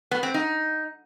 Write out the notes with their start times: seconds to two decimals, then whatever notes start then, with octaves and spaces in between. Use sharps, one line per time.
0.11 B3
0.23 C4
0.34 D#4